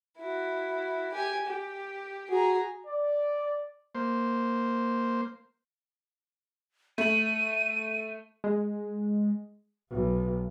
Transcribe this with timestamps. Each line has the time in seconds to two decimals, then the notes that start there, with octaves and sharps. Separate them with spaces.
0.18 E4 F#4
1.13 G4 G#5
1.46 G4
2.30 F#4 G#4 A#5
2.87 D5
3.95 A#3 C5
6.98 A3 D#7 F#7
8.44 G#3
9.90 B1